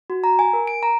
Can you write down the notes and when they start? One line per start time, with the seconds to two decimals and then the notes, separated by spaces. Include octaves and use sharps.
0.10 F#4
0.24 A#5
0.39 G#5
0.53 A#4
0.67 D7
0.83 A#5